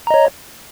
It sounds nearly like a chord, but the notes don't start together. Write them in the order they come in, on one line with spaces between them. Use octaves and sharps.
A#5 D#5 C#5